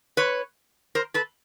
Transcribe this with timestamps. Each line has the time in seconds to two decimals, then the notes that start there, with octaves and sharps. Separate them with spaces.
0.17 B4 C#5
0.95 A#4 C5
1.14 A4 B4